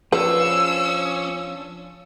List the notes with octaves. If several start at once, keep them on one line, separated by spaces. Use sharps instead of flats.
F3 C#4 D4 B4 E6